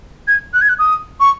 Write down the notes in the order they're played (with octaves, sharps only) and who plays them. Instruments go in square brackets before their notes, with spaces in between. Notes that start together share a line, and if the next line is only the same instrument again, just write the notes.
[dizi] G#6
F#6
G#6
F#6
D#6
C#6